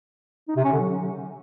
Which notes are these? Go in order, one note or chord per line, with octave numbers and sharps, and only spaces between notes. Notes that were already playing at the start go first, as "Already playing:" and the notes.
D#4
C3
C#4
D3
F#3